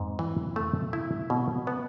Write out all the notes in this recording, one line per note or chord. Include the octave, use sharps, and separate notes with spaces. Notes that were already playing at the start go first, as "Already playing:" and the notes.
Already playing: F2 G#2
E3
A3
E4
B2
B3